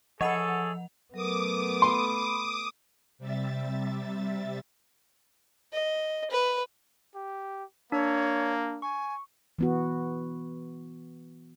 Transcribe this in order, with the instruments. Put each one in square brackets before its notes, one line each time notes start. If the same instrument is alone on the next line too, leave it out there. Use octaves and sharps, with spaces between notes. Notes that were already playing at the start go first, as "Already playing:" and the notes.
[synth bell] F3 F#5 F7 [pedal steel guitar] G#4 C#5 [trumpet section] A4 [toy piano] D#5 B5
[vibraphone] F#3 A#4 [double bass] A3 B3 [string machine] D6 D#6
[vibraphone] B5 [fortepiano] C6
[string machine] C3 G3 E5 A6
[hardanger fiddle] D#5
B4
[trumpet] G4
[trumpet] A#3 [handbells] D4 [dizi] C#5
[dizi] G#5 [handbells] C#6
[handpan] E3 B3 F#4